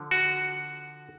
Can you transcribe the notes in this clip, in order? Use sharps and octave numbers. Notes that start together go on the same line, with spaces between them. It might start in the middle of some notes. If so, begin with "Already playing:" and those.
Already playing: D3 F3
F#4